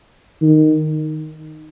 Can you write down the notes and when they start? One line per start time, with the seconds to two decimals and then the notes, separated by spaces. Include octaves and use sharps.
0.42 D#3